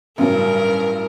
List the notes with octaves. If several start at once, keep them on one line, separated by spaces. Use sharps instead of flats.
A1 G2 C#3 F#3 A#4